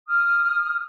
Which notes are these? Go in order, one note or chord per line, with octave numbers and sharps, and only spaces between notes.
D#6 F6